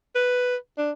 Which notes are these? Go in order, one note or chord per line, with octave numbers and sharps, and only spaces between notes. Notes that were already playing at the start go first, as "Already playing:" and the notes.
B4
D4